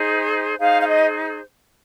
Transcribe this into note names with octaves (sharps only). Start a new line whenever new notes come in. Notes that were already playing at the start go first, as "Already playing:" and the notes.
Already playing: D#4 G#4 C5
D#4 G#4 C5 F5
F5
D#5